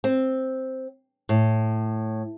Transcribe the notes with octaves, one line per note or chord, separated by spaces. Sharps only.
C4
A2